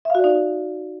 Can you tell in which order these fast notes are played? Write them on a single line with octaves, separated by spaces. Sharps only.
E5 F5 F#4 D5 D#4